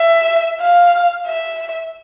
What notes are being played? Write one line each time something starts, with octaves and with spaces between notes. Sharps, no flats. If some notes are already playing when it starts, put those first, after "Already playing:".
Already playing: E5
F5
E5